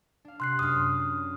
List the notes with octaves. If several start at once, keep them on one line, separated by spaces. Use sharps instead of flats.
D4 F5
C3 C6 F#6 C7
F#2 C#4 D4 D#6 F6